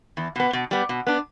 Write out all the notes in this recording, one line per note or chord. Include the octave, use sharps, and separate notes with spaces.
E2
B2 B3
B2
G3 B3
B2
B3 D4